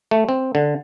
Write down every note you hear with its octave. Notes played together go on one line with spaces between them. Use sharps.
A3
C4
D3